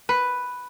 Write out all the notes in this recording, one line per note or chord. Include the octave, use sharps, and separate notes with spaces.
B4